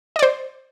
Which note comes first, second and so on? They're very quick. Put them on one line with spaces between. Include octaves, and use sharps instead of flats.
D#5 D5 C5